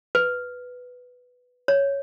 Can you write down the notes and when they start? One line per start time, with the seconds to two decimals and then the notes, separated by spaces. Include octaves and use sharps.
0.15 B4
1.68 C#5